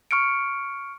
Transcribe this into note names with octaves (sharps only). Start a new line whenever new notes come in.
C#6 F6 C#7 D7